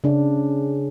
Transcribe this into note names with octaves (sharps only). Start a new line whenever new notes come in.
C#3 D4